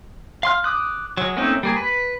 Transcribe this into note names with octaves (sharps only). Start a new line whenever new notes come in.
F5 C6 F6
D6 D#6 F#6
F#3 G#3
A3 A#3 C4 C#4 D#4
G3 A#3 G#4
B4